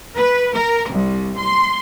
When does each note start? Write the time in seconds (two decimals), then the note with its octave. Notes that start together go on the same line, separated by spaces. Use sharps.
0.17 B4
0.55 A#4
0.90 C2
1.38 C6